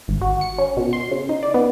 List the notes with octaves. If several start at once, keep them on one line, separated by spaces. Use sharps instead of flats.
G#1
F#4
C#7
C#4
B2
C6
C#3
D#4
D5
B3